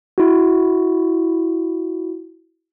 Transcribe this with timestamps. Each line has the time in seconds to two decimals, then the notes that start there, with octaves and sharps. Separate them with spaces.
0.18 E4 F#4